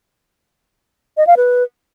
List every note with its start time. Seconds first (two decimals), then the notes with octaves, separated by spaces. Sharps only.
1.17 D#5
1.27 F5
1.37 B4